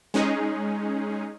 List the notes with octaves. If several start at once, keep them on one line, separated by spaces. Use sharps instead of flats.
G#3 C#4 D#4 G#4